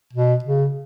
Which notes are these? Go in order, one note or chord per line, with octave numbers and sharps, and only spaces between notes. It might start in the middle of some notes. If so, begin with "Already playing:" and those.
B2
C#3